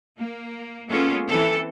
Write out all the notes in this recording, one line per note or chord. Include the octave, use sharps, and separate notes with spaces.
A#3
G#3 A#3 B3 C#4 F4 A4
E3 C4 A4